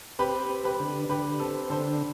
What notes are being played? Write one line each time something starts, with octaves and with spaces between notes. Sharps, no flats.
C4 G4 B4
C4
G4 B4
D3
D3 G4 B4
C4 A4
D3 A4 C5